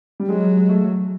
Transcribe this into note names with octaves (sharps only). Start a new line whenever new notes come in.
G3
F#3 G#3
G#3
A3